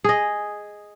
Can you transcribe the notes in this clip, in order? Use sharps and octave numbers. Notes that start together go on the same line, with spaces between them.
G#4 D#5